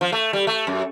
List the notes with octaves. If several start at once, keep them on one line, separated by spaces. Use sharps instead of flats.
F3
A3
G3
A3
F#2